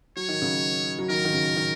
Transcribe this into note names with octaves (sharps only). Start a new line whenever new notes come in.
F#3 C#5
D#3
C#3 F#3
F#3
D#3 A#4
D#3
C#3
D#3